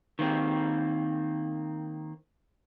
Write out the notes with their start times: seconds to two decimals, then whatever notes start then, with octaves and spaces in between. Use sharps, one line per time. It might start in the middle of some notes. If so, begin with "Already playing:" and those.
0.19 D#3 A#3 C4